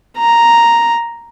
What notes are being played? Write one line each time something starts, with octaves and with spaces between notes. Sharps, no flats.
A#5